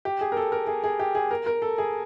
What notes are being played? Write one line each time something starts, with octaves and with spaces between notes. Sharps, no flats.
G4
G#4
A#4
A4
A#4
G#4
G#4
G4
G#4
A#4
A#4
A4
G#4